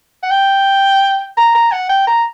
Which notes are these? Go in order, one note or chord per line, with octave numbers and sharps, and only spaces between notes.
F#5
G5
A#5
A#5
F#5
G5
A#5